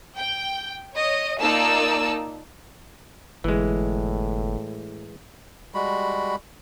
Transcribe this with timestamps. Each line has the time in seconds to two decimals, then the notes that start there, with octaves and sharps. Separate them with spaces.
0.16 G5
0.95 C#5 D#5
1.40 A#3 D#4 F4 D5 A5 E6
3.44 G1 A2 E3 G#3
5.74 G3 G#3 F#4 B5